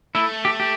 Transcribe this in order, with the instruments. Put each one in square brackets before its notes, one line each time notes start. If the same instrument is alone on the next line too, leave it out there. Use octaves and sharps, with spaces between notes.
[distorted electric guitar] A3 [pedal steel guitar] E4
[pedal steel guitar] G4
G4